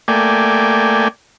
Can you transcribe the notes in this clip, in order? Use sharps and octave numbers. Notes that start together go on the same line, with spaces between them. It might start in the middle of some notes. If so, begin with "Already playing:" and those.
A3 A#3 D5 G5 G#5